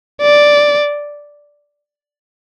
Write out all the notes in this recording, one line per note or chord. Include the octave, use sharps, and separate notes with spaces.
D5